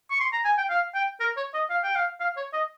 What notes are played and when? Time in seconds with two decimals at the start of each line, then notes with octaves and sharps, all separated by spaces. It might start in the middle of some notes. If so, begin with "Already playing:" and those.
0.11 C#6
0.20 C6
0.33 A#5
0.45 G#5
0.58 G5
0.70 F5
0.95 G5
1.20 A#4
1.37 C#5
1.54 D#5
1.70 F5
1.84 G5
1.95 F5
2.20 F5
2.37 C#5
2.53 D#5